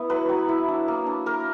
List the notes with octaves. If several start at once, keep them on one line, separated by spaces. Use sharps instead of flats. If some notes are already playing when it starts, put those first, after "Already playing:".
Already playing: B3 E4
F#3 B4
F#3
E4
D4
A#3
D4
A#3 A#4